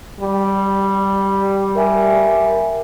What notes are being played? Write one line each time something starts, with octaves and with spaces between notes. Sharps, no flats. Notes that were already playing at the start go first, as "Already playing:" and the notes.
G3
A#4 E5 G#5